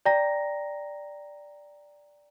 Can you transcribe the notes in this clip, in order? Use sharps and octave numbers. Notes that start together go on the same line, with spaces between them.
D5 G5 A#5 A#6